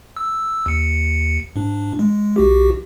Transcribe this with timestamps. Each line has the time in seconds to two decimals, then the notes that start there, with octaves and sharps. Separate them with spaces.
0.17 E6
0.66 D#2 C#7
1.56 G#2 D4
1.99 G#3
2.36 B1 F#4 G4